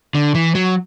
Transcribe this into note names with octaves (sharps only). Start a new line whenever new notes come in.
D3
E3
F#3